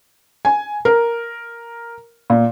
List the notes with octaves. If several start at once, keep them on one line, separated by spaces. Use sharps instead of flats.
G#5
A#4
A#2